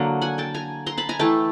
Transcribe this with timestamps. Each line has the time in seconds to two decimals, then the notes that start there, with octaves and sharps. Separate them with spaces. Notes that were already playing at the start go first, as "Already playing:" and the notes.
Already playing: D3 F#3 A#3
0.21 F#5 G#5
0.38 G5 A5
0.54 G#5 A#5
0.86 A#5 C6
0.98 A5 B5
1.09 G#5 A#5
1.19 E3 A3 G5 A5